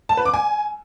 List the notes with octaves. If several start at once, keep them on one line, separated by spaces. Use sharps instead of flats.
A5
B4
D6
G#5